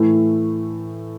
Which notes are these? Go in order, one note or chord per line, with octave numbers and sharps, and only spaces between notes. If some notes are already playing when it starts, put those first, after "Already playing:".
Already playing: A2 E3 A3